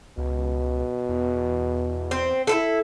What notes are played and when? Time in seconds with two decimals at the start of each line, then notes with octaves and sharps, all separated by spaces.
0.18 C#2 B2
1.09 E2
2.11 C4
2.47 E4 F4 A4